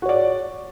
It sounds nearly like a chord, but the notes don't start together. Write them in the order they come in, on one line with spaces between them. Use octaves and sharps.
F#4 C#5 D5